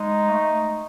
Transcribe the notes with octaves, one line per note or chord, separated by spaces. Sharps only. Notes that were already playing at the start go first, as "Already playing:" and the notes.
Already playing: G#3 D#4
A3